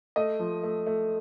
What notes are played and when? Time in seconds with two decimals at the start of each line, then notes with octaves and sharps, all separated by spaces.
0.16 A3 D#5
0.40 F3
0.63 A3
0.87 A3